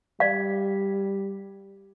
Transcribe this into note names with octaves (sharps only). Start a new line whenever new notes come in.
G3 D5 F5